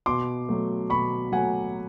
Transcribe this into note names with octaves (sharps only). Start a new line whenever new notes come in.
B2 C6 D6
F#3 A3
B2 B5 C#6
F#3 A3 F#5 G#5